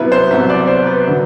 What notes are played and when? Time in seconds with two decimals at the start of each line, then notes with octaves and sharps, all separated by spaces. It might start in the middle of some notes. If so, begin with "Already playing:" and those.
Already playing: C2 B2 F#3 E4 B4
0.12 C5
0.31 C2 B2 F#3 E5
0.50 D5
0.68 C5
0.87 B4
1.07 D3 F#3